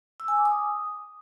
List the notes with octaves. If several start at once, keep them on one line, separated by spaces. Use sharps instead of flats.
E6
G#5
D6
D#6